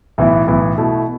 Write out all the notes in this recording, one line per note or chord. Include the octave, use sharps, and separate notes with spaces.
B1 A2 E3 B3 E4
B1 A2 E3 B3 E4
B2 A3 E4